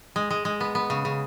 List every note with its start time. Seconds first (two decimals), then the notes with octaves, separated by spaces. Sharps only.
0.16 G#3
0.31 G#3
0.45 G#3
0.60 B3
0.75 B3
0.90 C#3
1.05 C#3